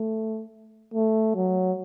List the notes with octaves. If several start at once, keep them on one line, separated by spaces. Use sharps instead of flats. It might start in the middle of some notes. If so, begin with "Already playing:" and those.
Already playing: A3
A3
F#3